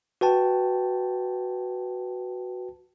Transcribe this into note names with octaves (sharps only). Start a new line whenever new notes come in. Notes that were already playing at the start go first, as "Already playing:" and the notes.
F#4 B4 G5 A5